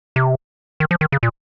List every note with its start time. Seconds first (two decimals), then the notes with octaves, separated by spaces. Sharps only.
0.16 C3
0.80 D#3
0.91 F3
1.01 D#3
1.12 C#3
1.23 A#2